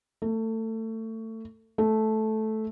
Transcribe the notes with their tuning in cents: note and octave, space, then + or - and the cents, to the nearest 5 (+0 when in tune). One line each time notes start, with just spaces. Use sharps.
A3 +25
A3 -10